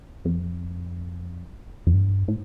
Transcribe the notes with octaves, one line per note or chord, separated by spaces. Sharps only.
F2
F2
G2
A2